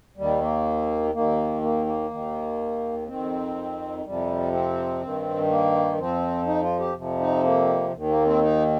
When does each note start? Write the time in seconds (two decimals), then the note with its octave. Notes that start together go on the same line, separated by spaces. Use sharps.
0.17 D#2 D#3 G3
0.41 A#3
1.14 D#2 D#3 A#3
1.62 A#3
1.86 A#3
2.10 D#2 D#3
3.07 F2 D#3 C4
4.05 F2 C3 F3 G3
4.53 C4
5.02 G2 D#3
5.50 A#3
5.98 F2 F3 C4
6.47 D#4
6.63 F4
6.79 G4
6.95 F2 C3 F3
7.20 D#4
7.44 A#3
7.92 D#2 D#3
8.09 A#3
8.25 C4
8.41 D#4